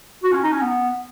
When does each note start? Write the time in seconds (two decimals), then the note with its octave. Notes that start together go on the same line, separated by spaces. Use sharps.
0.23 F#4
0.32 C#4
0.43 D#4
0.52 C#4
0.61 B3